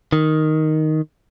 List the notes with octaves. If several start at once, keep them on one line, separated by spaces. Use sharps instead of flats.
D#3